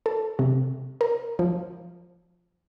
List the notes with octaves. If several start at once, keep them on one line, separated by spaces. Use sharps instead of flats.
A4
C3
A#4
F3